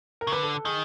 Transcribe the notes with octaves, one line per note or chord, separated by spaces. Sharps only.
A#4
C#3
D3 B4
A4
A4
D#3 G#4